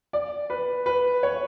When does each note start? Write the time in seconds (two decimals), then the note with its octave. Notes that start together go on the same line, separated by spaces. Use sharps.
0.13 D5
0.50 B4
0.86 B4
1.23 C#5